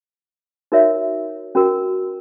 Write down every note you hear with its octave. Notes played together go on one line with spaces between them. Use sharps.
D#4 F#4 A#4 C#5 E5
C#4 F#4 A#4